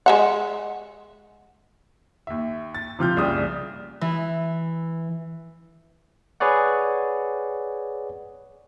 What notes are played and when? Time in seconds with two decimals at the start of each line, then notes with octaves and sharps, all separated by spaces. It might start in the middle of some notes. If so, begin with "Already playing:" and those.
0.06 G#3 E5 F#5
2.27 D#2 E5
2.75 A6
2.99 C3 F3 F6 G6
3.16 F#1 C2 C#3 D5 D#6
4.01 E3
6.40 G#4 B4 C#5 D5 F#5